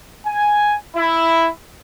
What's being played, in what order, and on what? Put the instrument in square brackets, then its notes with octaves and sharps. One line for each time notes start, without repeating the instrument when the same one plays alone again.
[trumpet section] G#5
E4